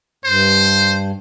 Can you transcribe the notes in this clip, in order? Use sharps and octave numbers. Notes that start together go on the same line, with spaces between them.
G2 C5